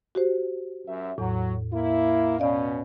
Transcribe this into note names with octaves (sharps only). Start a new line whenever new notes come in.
F#4 G4 C5
F#2 E5
E2 A2 F#3
A#3 E4
B2 C#4 D5 D#5 F5